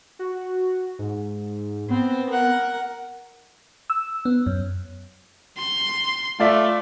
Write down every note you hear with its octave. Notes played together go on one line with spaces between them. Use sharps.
F#4
G#2
B3 C4
A#4 F#5
E6
B3
F#2
C6
A3 F4 D5 E5